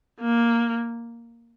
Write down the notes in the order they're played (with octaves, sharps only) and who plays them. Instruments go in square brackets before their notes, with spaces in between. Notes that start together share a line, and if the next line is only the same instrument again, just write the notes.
[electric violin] A#3